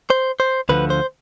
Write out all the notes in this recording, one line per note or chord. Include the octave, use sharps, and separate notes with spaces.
C5
C5
D2 D3 F3 B4
C5